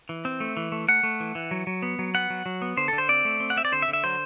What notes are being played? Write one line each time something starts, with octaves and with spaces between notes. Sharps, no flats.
E3
C4
A3
E3
A3
A3 F#5
A3
E3
E3
F#3
F#3
B3
F#3
B3 F#5
F#3
F#3
B3
D3 C5
A4
D3
C5
C4 D5
A3
C4
F#5
C4 E5
D5
D3 C5
E5
D3
E5
F#3 C5